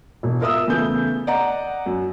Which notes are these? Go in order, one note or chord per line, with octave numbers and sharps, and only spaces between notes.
E1
F4 A#4 E5 D#6 E6
E2 C#3 A3 G6
D5 D#5 F#5 A#5
F#2